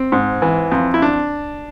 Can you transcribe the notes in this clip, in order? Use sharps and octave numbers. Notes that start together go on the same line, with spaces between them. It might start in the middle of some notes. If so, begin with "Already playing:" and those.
Already playing: C4
G#2
E3
F2
E4
D4